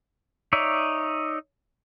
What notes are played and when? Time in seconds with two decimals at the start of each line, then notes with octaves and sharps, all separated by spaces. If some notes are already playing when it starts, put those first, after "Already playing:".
0.53 D#4 C#5 D5 E5